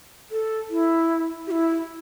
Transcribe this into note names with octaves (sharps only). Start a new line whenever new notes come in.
A4
E4
G4
E4